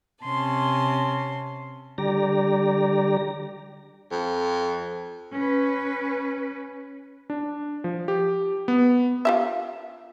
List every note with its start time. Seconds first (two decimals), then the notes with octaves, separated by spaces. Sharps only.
0.24 C3 C#4 A5 C6
1.98 D3 G3 G4 D5 A#5 A#6
4.11 F2
5.32 C#4 B4
7.30 D4
7.84 F3
8.08 G4
8.68 B3
9.25 F4 G4 E5